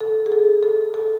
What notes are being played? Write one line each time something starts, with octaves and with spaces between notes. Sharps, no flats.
A4
G#4
A4
A4
A4